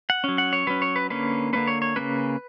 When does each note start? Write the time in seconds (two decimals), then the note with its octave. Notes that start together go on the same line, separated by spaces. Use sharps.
0.10 F#5
0.24 F#3 C#4
0.38 F#5
0.53 C#5
0.67 F#3 C#4 B4
0.82 C#5
0.96 B4
1.10 D3 A#3 C#4 B4
1.53 D3 A#3 C#4 B4
1.68 C#5
1.82 C#5
1.96 C#3 G3 A#3 C#4 B4